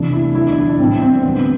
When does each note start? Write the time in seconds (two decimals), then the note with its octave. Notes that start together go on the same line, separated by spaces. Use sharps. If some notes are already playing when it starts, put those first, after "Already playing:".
Already playing: E2 C3 E3 A3 D4
0.13 E4
0.35 E2 D3 F#3 E4
0.47 D4
0.69 D4
0.79 A2 G3 C4
1.02 C4
1.23 E2 D3 G3 B3